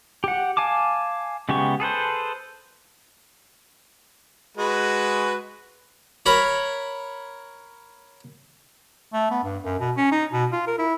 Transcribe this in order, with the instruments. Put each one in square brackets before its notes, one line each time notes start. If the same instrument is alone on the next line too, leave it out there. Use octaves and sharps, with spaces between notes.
[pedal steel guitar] G4 F#5
F5 G#5 A5 D6
C#3 G#3 B3 G4 C#6
G#4 A4 B4 C5
[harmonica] G#3 F#4 B4
[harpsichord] A#4 C#5 B5
[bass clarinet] A3
B3
G2
F#2
B2
C#4
D#4
B2
F4
A#4
E4